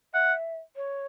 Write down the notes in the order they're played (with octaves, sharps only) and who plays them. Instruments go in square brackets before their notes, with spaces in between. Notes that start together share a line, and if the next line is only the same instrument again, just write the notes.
[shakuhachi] E5 [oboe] F#5
[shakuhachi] C#5